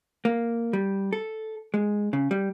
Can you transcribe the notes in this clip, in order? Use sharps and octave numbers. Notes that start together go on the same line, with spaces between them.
A#3
G3
A4
G#3
C#3
G3